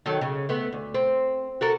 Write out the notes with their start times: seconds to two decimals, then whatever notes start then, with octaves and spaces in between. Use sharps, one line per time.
0.06 D#3 F#3 A4
0.21 C#3
0.49 A3 B3
0.73 D2
0.94 C4
1.61 F#4 A4 A#4